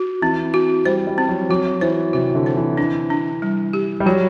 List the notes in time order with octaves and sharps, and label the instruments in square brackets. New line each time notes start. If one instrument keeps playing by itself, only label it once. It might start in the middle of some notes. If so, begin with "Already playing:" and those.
Already playing: [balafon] F#4
[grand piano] E3 [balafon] C4
[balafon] F#4
[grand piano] G3 [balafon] C5
[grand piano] G3
[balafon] C4
[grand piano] F#3
[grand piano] F#3 [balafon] F#4
[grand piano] E3 [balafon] C5
[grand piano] C3 [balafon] F#4
[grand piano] D3
[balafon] C5
[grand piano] E3
[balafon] D4
D4
G3
G4
[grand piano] G3
[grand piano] F#3 [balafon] G4